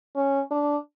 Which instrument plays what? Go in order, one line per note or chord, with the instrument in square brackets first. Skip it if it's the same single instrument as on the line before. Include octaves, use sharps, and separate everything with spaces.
[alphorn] C#4
D4